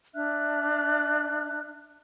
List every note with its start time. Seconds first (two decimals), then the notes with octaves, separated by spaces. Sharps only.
0.15 D4 E5 F6 F#6